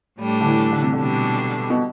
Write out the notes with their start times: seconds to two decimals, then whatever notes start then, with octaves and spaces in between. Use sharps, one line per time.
0.18 A2 G3 D4
0.40 D3
0.45 E3
0.72 D3
0.82 C3
0.93 D3
0.98 B2 G3 D4
1.70 B2